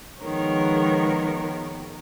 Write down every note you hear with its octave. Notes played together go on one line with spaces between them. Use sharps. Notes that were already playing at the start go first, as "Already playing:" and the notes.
D#3 F3 G#3 B3 A#4 C#5